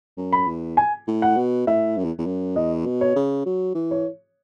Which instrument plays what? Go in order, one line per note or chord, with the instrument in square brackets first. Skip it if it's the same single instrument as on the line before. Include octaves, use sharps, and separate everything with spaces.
[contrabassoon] F#2
[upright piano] B5
[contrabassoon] E2
[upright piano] G#5
[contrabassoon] A2
[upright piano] F#5
[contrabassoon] B2
[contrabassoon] A2 [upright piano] E5
[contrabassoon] F#2
E2
E2
F#2
[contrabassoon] E2 [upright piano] D#5
[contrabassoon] B2
[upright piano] C#5
[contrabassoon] C#3
F#3
E3
[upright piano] C#5